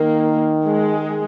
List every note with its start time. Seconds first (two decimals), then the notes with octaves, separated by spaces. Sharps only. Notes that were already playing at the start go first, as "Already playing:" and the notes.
Already playing: D#3 A#3
0.66 G#3